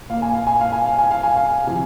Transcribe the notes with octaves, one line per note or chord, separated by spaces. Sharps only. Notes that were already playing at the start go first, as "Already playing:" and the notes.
A#2 A#3 F5
G#5
F5
G#5
F5
G#5
F5
G#5
F5
G#5
F5
C3 F3 G#5